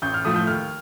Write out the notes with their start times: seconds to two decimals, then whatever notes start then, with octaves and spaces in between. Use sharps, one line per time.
0.02 A1 G6
0.14 F6
0.25 A2 F3 A3 D#6
0.36 G6
0.47 D#2 F6